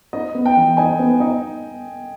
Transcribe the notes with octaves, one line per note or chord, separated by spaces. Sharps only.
D#4 D#5
B3
G5
E3
D#4 G#5
B3
D#4